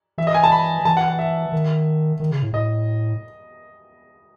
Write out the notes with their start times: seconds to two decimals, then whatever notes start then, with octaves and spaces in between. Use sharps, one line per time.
0.18 E3 E5
0.27 D#5
0.34 G#5
0.44 A5
0.52 B5
0.85 E3 A5
0.97 F#5
1.08 F#5
1.19 E5
1.52 D#3
2.20 D#3
2.31 C#3
2.42 A2
2.53 A2 D#5